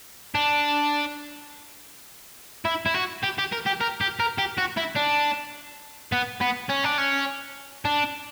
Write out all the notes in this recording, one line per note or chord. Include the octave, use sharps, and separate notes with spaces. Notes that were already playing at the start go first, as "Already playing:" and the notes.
D4
E4
E4
F#4
G4
G4
A#4
G4
A#4
G4
A#4
G4
F#4
E4
D4
B3
B3
C#4
D4
C#4
D4